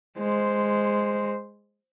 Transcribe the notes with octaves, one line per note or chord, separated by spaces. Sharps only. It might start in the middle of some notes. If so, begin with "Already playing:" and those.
G#3 C5